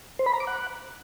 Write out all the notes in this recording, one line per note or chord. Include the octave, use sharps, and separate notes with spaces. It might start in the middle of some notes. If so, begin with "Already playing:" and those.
C5
B5
A#5
D6
F#5